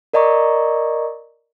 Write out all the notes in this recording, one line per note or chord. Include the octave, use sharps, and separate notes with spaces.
A#4 D5 D#5 A#5 C#6